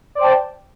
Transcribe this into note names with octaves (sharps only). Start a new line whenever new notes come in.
C5 D5 G5 A5